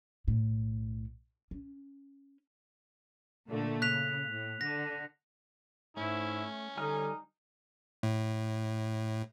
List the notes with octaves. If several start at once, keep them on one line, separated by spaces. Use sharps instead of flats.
B1 A2
C#4
A#2 D3 A3
C#3 F#6 B6 F7
A2
D3 A#6
G#2 A3 C#4 E4
D3 G3 D#4 G#5 F6
A2